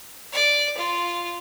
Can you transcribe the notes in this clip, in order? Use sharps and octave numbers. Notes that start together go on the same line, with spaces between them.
D5
F4